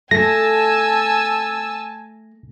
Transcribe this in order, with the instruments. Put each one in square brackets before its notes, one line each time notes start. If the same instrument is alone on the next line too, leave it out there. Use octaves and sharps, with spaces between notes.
[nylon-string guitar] A3 [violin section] G#5 A5 E6 [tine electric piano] A#6